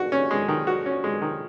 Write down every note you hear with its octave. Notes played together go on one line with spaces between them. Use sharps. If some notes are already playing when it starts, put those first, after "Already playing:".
Already playing: F#4
C#4
G#3
D#3
F#4
C#4
G#3
D#3